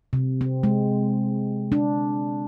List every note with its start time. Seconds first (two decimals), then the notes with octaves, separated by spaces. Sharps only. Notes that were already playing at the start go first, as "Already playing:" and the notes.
0.13 C3
0.41 C4
0.63 G#3
1.72 D4